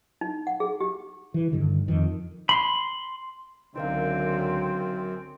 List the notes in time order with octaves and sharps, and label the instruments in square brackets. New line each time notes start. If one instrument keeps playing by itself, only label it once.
[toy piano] D#4
F#5
G#4
G4
[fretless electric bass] E3
G2 D3 D#3
F2 D#3
[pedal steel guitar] B5 C6
[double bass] C#2 D3 [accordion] F#2 [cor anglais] C4 [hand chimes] D#4 A#4 F5